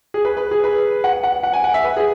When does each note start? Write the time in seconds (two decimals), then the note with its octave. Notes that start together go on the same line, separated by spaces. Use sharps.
0.14 G#4
0.25 B4
0.37 B4
0.51 G#4
0.64 B4
1.04 F#5
1.24 F#5
1.43 F#5
1.53 G#5
1.64 F#5
1.74 E5
1.84 B4
1.97 G#4